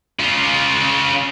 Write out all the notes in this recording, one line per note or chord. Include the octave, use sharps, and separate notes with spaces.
C#3 F4